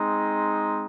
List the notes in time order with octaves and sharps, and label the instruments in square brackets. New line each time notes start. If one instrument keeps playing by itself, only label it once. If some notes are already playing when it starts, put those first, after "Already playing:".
Already playing: [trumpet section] G#3 C4 D#4